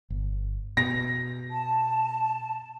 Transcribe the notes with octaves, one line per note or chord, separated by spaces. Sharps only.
G1
B2 A#6
A5